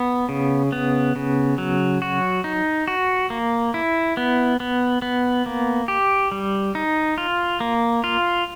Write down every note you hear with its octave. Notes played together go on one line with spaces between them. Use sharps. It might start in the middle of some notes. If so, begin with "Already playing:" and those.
Already playing: B3
C#3
B3
C#3
F#3
F#4
D#4
F#4
A#3
E4
B3
B3
B3
A#3
G4
G3
D#4
F4
A#3
F4